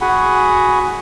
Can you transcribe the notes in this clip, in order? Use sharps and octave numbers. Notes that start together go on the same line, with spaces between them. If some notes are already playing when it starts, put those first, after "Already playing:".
F#4 G#4 F#5 G#5 B5